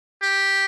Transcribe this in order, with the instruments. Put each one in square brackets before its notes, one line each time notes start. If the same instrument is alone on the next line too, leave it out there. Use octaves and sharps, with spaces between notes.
[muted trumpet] G4